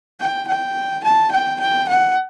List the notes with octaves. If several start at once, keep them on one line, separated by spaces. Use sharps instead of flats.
G5
G5
A5
G5
G5
F#5